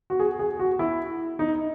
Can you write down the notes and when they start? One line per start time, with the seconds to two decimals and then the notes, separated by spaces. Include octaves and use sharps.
0.10 F#4
0.20 G#4
0.39 G#4
0.59 F#4
0.79 E4
1.39 D#4